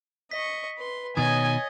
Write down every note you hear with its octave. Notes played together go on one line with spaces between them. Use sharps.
D#5 C#6 B6
B4 C6
B2 D#3 C#5 D#5 G#5 D#6 G#6 A6